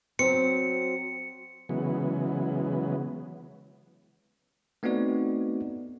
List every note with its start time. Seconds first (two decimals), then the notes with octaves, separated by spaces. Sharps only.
0.19 F#3 C4 C#7
1.69 C#3 E3 F#3 G#3 B3
4.83 A3 B3 C4 D#4 F#4 D5